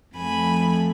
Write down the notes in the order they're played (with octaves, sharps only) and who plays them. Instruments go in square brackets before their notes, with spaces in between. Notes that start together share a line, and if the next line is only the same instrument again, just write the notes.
[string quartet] F2 F3 A3 G#5 B5